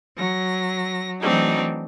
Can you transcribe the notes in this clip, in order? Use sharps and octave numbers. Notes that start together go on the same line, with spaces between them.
F#3 A#6
E3 F#3 A3 C4 D4 D#4